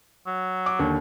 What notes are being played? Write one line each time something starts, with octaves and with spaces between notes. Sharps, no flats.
F#3
D6
D#2 D3